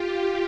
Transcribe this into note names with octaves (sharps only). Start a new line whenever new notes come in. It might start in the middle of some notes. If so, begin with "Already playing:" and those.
Already playing: F4 G4